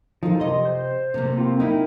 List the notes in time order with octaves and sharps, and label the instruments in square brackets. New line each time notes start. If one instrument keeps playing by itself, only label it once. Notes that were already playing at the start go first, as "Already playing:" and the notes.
[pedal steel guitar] F3 [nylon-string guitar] D#4 A4
[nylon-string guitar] C3 D#5 [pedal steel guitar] C6
[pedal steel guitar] C5
[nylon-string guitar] C3 A3 A#3
[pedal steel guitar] C4 F4
[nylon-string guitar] D#4 E4 [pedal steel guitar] A#4 G5